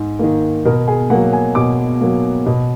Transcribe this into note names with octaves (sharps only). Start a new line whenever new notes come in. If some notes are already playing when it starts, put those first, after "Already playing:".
Already playing: G#2
D#3 A#3
B2 A#4
G#4
F#3 A#3 F#5
G#5
B2 D6
F#3 A#3
B2